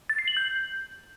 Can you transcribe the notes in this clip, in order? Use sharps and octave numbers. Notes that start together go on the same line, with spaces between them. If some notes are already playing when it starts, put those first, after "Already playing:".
A6
C7
F#7
G6